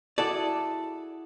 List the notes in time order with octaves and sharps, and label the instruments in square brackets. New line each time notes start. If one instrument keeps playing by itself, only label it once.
[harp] E4 F#4 G#4 [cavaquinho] A4 [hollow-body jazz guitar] D5